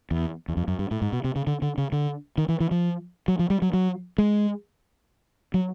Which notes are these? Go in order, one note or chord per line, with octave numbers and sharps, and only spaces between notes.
E2
E2
F2
F#2
G2
A2
G#2
B2
C3
C#3
D3
D3
C#3
D3
D#3
E3
E3
F3
F#3
F3
G3
F#3
F#3
G#3
F#3